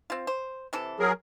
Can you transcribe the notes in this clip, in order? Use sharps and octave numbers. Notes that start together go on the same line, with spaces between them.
C4 F4
C5
C3 E3 A4
F#3 G#4 A#4